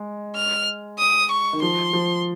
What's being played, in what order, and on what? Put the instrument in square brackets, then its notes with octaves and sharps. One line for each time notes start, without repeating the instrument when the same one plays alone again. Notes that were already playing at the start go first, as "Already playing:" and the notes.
Already playing: [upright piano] G#3
[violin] F6
D#6
C#6
[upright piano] D#3
[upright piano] F3 [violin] C6
[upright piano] F3